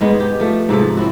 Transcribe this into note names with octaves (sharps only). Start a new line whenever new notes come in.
G#2 G#3 B3
G4
F3 A3
G#2 C3 F3 A4
C4 C#4 E4 F#4